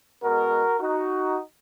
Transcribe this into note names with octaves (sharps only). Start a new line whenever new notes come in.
B2 G#3 B3 F#4 A#4
D#4 F#4